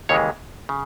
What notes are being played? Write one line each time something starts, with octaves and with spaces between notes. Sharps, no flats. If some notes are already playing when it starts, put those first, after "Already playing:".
D#2 C#3 E3 G#3 C#5
C#3